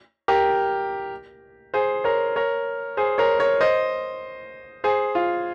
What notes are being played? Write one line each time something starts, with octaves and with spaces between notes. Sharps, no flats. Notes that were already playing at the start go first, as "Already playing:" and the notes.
G4 A#4
G#4 C5
A#4 C#5
A#4 C#5
G#4 C5
A#4 C#5
A#4 C#5
C5 D#5
G#4 C5
F4